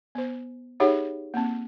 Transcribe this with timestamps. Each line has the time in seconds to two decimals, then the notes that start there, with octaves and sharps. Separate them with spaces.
0.15 B3 C5
0.80 D#4 G4 G#4 C#5 E5 F#5
1.34 A#3 C4